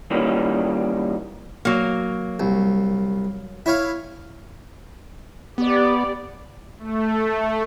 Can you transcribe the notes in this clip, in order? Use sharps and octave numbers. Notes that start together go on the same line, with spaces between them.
D#3 E3 G3 A#3 C#4
F#3 A#3
C2
E4 C#5 F5
B3 G4 D5
A3